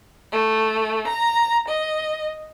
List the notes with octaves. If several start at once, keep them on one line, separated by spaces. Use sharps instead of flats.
A3
A#5
D#5